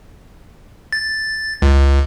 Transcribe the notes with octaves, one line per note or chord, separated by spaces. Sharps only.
A6
C#2